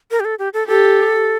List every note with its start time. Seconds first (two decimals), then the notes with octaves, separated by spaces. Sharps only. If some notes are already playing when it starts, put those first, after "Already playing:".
0.11 A#4
0.20 G4
0.25 A4
0.39 G4
0.54 A4
0.67 G4 A4